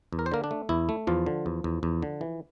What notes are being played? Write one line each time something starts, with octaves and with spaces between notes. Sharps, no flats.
E2
A#4
C5
D3 A#3 A#4
D4
A3
E2 E4
A3
E2 F3 F4
D3
E2
E2
E2
D3
E3